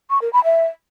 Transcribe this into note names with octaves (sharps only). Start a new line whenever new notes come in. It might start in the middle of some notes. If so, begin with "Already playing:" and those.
C#6
A#4
B5
E5